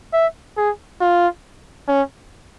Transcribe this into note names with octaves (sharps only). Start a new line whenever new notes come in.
E5
G#4
F4
C#4